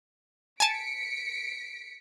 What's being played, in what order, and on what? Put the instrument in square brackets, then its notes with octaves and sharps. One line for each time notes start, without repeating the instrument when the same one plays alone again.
[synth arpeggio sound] G#5 A5 [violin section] B6 C#7 D7